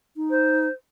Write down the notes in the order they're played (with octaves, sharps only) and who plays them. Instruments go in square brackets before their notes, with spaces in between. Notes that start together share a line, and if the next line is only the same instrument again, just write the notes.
[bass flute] D#4
[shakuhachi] C5